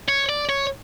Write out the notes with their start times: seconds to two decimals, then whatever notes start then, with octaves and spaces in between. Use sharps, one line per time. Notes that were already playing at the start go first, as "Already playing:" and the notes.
0.08 C#5
0.29 D5
0.49 C#5